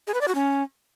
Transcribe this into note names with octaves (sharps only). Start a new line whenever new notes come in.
G#4
B4
D5
F#4
C#4